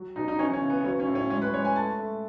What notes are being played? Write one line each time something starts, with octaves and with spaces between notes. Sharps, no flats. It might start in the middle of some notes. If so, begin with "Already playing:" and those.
Already playing: F#3
B2 D#4
D#4
E3 C#4
C#4
C#3
B3
B3
F#3 C#4
C#4
A2
C#4
G#3 C#4
B4
G#3 C#5
G#5
A3 A5
A3